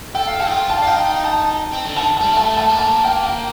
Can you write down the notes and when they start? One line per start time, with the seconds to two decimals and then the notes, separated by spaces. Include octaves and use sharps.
0.15 A4 G5
0.27 F5
0.39 G5
0.47 D#4
0.51 F4 G5
0.70 A5
0.78 D4 F5
0.87 D#4 G5
1.24 A5
1.72 C4
1.85 D3
1.96 D#3 A5
2.17 G3 A5
2.33 A3 A5
2.57 A5
2.69 A#3
2.79 A5
3.05 G5
3.23 G5